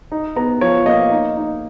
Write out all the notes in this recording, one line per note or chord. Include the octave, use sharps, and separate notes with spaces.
D#4
B3 A#5
F3 C#5
A#3 D#5
D#4
D#4